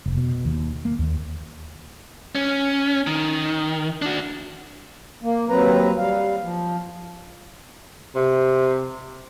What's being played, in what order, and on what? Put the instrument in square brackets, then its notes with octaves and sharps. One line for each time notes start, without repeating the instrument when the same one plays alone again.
[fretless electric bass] F1
B2
D#2
A#3
D#2
[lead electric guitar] C#4
D#3
D4 F#4
[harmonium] A#3
D#2 F#3 C4 B4 A#5
G3 F5
F3
[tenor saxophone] C3